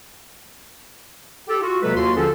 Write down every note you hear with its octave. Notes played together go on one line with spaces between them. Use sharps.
G4 A4
F4 F#4
C3 F#3 G#3 A#3 A4 B4
D#2 F4 F#4 C6
D3 F3 C#4 G#4 A4